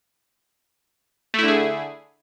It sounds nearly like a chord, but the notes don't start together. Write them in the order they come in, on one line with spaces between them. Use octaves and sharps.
A3 E4 D3 G#4